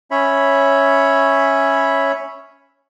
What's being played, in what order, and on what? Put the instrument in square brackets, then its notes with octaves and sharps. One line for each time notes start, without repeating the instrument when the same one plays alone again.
[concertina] C#4 C#5 E5 B5